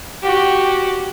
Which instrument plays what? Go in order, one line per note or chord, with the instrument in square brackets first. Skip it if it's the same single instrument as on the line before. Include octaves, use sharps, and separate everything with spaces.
[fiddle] F#4 G4